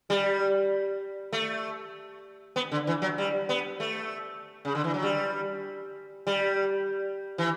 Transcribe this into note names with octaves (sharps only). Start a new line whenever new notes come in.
G3
A3
B3
D3
E3
F#3
G3
B3
A3
C#3
D3
E3
F#3
G3
G3
E3